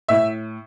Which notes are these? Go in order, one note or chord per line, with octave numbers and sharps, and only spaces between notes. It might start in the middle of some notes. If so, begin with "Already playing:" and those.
A2 E5